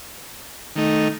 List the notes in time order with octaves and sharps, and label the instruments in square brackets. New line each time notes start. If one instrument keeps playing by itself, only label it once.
[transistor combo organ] D#3 A3 D#4